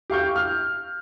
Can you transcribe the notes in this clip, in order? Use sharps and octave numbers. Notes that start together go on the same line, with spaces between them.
G4 F5 C#6 G6
F6